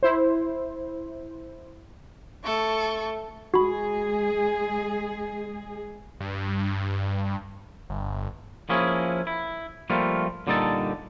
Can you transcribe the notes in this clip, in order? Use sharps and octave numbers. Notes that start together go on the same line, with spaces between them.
E4 C5
A3 A4 C#6
G#3 F#4 G#4 B5
G2
G1
F3 A#3 C#4 E4 G#4
E4
F3 G3 A3 A#3 F4
A#2 D3 G3 D#4 A4 A5